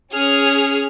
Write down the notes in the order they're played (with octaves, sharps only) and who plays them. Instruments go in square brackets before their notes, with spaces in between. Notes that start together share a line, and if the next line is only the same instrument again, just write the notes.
[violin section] C#4 G#4 F6